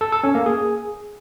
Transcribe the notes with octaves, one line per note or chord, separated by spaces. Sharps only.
A4
A4
C#4
A#3
G#4